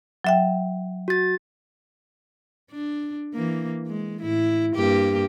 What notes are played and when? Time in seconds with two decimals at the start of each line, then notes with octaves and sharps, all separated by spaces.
0.24 F#3 E5 G5
1.08 F#4 A6
2.71 D4
3.35 E3 A#3
3.88 G#3
4.22 A2 E4
4.75 G2 A#3 G4